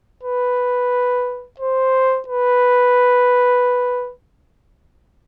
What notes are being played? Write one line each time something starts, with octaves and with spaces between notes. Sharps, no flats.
B4
C5
B4